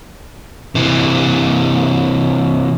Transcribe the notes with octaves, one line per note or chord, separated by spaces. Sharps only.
C3 E3